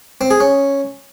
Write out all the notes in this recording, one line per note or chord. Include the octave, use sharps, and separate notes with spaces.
C4
G#4
C#4